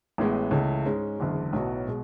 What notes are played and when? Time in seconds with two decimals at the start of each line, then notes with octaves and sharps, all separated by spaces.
0.18 A1 A2 G#3 B3
0.51 C#2 C#3 E3 A3
0.85 G#2 G#3 C#4
1.19 F#1 E2 D3 G#3
1.53 B1 A2 F#3 B3 F#4
1.87 B2 G#3